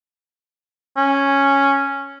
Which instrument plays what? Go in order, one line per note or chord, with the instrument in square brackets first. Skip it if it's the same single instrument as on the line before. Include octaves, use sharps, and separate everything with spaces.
[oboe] C#4